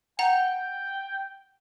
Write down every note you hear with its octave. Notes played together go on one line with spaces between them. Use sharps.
F#5 G5 A#5